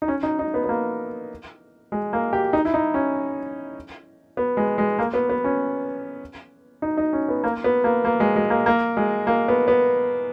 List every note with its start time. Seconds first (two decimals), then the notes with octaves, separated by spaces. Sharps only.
0.02 D#4
0.08 C#4
0.23 D#4
0.39 D#4
0.54 B3
0.64 B3
0.69 A#3
1.92 G#3
2.13 A#3
2.33 G4
2.53 D#4
2.65 E4
2.74 D#4
2.94 C#4
4.37 B3
4.57 G#3
4.78 G#3
4.99 A#3
5.14 B3
5.29 B3
5.44 C#4
6.82 D#4
6.97 D#4
7.13 C#4
7.29 B3
7.44 A#3
7.64 B3
7.84 A#3
8.05 A#3
8.20 G#3
8.36 G#3
8.50 A#3
8.66 A#3
8.97 G#3
9.27 A#3
9.48 B3
9.68 B3